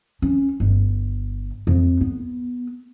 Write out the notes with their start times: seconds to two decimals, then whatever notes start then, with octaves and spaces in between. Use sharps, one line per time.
0.22 C#4
0.60 G1
1.67 F2
2.01 B3